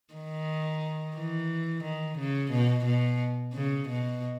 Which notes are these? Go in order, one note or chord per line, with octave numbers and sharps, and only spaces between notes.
D#3
E3
D#3
C#3
B2
B2
C#3
B2